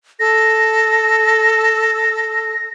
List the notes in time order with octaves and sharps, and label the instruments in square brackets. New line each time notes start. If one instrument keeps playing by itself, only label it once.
[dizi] A4 [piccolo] A#6